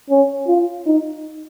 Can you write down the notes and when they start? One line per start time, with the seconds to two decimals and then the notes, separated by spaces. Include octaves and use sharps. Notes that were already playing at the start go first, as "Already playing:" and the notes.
0.10 C#4
0.48 F4
0.86 D#4